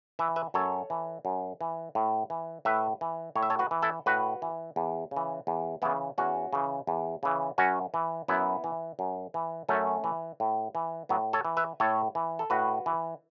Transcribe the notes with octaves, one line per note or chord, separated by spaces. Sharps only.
E3 E5
B4 E5
F#2 A4 C#5
E3
F#2
E3
A2
E3
A2 B4 E5
E3
A2 C#5
E5
A4 C#5
F#4 B4
E3
E4 A4
A2 F#4 B4
E3
E2
C#3
E3
E2
C#3 E3 B3 E4
E2 C#4 F#4
C#3 E3
E2
C#3 E3
F#2 C#4 F#4
E3
F#2 B3 E4
E3
F#2
E3
F#2 A3 C#4
E3
A2
E3
A2 F#3 B3
A4 C#5
E3
B4 E5
A2 A4 C#5
E3
A4
A2 F#4 B4
E3